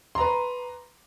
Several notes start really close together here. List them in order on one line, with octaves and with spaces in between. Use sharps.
C6 A#5 B4